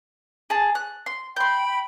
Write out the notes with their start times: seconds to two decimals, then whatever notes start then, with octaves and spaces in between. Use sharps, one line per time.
0.50 G#4 A5
0.75 F#6
1.06 C6
1.36 G5 B5 C6 G6